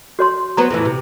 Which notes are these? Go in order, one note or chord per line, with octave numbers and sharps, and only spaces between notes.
F#4 C#5 C6
F#3 B3 C5 A#5
F2 A2 E3
C3